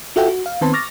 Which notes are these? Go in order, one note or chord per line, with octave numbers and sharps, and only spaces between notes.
F4 F#4 A4 E5 F#5 G5
F#4
F5
D#3 B3 C4 B4 A5 C6
C#6 D6 F6 A6 A#6